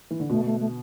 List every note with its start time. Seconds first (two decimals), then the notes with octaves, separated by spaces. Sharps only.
0.11 E3
0.20 D3
0.30 B2 A3
0.45 A3
0.60 A3